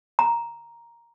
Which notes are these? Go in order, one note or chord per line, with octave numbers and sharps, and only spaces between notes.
A#5